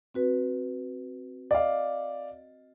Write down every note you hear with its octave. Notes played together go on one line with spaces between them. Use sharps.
C4 F#4 B4
D5 D#5 F5